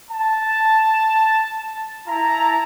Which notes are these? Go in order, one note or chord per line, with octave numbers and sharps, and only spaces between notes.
A5
E4 A5 A#5